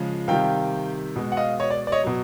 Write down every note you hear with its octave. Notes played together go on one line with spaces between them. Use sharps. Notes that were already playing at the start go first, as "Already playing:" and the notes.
Already playing: C#3 F3 G#3
C3 D#3 G3 F5 G5
B2 G#3
F#5
D#5 F5
C#5 D#5
D5
D5
C#5 D#5
B2 F#3